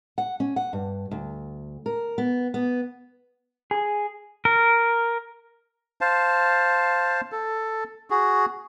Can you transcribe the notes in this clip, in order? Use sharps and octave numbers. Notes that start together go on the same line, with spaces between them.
F#5
C#4
F#5
G2
D2
A#4
B3
B3
G#4
A#4
C5 F5 A5
A4
F#4 G#4